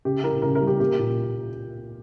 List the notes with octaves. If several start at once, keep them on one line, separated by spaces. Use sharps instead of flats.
C#3 G4
E4 A#4
C#3 A#4
A#4
G3
G4
A#3 G4
A#2